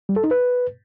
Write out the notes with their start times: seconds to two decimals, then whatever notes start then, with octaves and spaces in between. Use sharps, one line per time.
0.09 G3
0.16 A4
0.24 D#4
0.31 B4